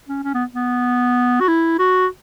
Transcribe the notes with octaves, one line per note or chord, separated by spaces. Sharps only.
C#4
C#4
B3
B3
F#4
E4
F#4